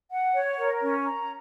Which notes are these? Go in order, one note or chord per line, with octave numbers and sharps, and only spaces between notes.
F#5
C#5
A#4
C#4
A#5